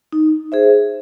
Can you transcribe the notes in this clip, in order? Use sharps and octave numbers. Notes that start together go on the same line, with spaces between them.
D#4
G#4 C5 E5